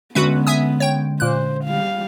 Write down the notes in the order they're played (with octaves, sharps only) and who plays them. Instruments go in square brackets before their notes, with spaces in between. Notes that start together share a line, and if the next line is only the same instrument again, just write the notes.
[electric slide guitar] D3 G#3 C#4 [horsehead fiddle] B3 [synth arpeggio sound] F#4 B4 E5
[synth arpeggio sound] E5 G#5 D#6
C#5 G5
[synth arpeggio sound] A#2 F#6 [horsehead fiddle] C5
[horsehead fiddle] G3 F5